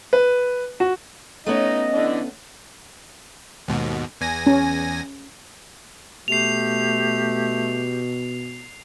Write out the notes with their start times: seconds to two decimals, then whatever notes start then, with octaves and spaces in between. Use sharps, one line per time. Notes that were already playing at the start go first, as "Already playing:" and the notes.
0.13 B4
0.80 F#4
1.46 A3 B3 C#4 D#4 D#5
1.93 D3 E3 D4
3.68 D#2 G#2 B2
4.21 E2 G#5 A#6
4.47 C#4
6.28 B2 A3 G4 C7 F7